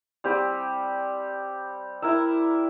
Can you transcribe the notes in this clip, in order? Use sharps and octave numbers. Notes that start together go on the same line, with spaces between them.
G3 C4 G4
E4 A#4 E5